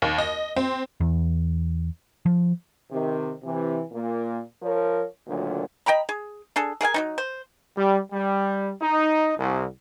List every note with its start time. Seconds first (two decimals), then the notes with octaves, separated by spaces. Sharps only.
0.02 D#2
0.18 D#5
0.56 C4
1.00 E2
2.26 F3
2.91 C3 D#3
3.43 C3 E3
3.92 A#2 A#3
4.62 F3 A#4 C#5
5.28 D2 A#2 D3 D#3 F#3
5.86 D#5 G5 A#5 B5
6.09 G#4
6.56 D4 G#4 A4
6.81 G#4 A#4 F5 G#5
6.94 F#3 G3 D#4
7.18 C5
7.77 G3
8.12 G3
8.81 D#4
9.39 C2